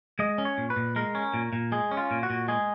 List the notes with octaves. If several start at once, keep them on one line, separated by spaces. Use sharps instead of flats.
G#3 D#5
C#4
C#5
A#2
B4
A#2
G#3 A#4
C#4
A#2
A#2
G#3 G#4
C#4
F4
A#2
F#4
A#2
G#3 G#4